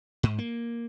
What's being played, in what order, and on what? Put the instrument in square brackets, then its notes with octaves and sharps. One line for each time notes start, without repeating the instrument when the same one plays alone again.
[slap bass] G#2
A#3